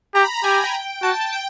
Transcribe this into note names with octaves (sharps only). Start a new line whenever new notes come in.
G4 A#5
B5
A#5
G4 G#5
G#5
G5
F#4 A5
G5